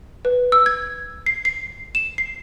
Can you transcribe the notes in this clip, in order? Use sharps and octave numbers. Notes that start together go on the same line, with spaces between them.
B4
E6
G#6
C7
C7
E7
C7